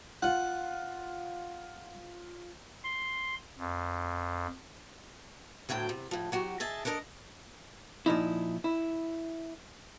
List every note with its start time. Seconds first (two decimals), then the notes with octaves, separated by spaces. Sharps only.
0.22 F4 F#5
2.84 C6
3.58 F2
5.69 D2 A2 F#3 A4 G5
5.89 C3
6.11 A2 F3
6.32 F#3 F#4 G4
6.60 G#4 D#5 E5 G#5 A5
6.85 D4 A4 A#4 C5 D#5
8.06 A#2 F3 D#4 E4
8.64 E4